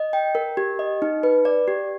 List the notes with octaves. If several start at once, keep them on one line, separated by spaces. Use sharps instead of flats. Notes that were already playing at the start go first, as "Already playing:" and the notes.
Already playing: D#5
G5
A#4
G4
D#5
D#4
B4
D5
G4